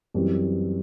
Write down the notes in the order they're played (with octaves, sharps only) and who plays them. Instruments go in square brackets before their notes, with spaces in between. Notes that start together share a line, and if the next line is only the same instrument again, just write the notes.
[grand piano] F#2 E3 G3 C4 G4